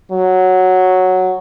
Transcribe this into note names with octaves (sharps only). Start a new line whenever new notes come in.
F#3